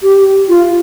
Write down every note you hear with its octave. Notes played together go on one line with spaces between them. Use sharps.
G4
F4